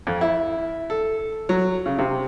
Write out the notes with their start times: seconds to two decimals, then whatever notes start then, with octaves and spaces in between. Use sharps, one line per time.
0.07 F2
0.21 E4
0.90 A4
1.49 F#3
1.86 C#3
1.99 C3